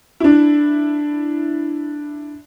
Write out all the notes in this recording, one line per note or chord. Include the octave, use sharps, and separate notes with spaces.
D4 E4